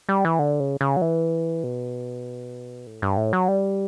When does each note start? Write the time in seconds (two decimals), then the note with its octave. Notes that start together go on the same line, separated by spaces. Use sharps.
0.09 G3
0.25 E3
0.39 D3
0.60 C#3
0.81 C#3
0.97 F#3
1.02 E3
1.64 B2
2.87 A2
3.02 G2
3.17 A2
3.33 F#3
3.48 G3